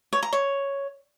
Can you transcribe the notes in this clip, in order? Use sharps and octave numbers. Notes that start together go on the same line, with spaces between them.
C#5
A#5
C#5